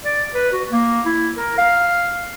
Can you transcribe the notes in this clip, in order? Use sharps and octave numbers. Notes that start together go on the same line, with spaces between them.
D5
B4
F#4
A#3
E4
A#4
F5